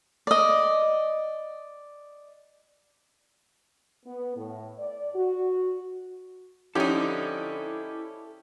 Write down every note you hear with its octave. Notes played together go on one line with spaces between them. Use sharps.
D5 D#5
B3
A2
D5
F#4
F3 C#4 D#4 E4 G4 A4 D5